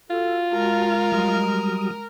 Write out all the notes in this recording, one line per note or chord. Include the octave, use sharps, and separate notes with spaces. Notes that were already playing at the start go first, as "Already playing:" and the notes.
F4 F#4 A4
G#3 F#4 A#4 A5
F#3 G3 D#6